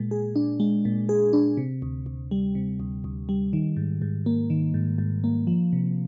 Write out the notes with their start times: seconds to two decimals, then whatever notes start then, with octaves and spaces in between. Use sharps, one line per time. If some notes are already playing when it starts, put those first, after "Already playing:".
Already playing: A#2 G#3
0.11 G#4
0.36 D4
0.60 G#3
0.85 A#2
1.09 G#4
1.33 D4
1.57 C3
1.82 D2
2.06 D2
2.31 G3
2.55 C3
2.80 D2
3.04 D2
3.29 G3
3.53 D#3
3.77 G#2
4.02 G#2
4.26 A#3
4.50 D#3
4.74 G#2
4.98 G#2
5.24 A#3
5.47 F3
5.73 C3